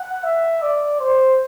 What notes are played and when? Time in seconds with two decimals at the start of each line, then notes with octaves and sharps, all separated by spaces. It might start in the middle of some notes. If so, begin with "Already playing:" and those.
Already playing: F#5
0.24 E5
0.62 D5
1.00 C5